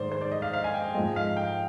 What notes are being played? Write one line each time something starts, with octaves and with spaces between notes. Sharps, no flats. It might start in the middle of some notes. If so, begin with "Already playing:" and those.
Already playing: G#2 D#3 G#3 C5 D5
C5
D5
D#5
F5
F5
G#5
G5
G#2 F3 G#3 D#5
F5
G5